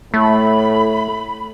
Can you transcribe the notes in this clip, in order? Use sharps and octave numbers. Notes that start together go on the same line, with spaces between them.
A2 A3 B5